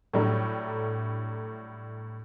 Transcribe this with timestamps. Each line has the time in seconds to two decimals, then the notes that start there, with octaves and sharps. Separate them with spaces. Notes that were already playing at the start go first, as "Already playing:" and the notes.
0.13 A2 F#3 G3 A3 D4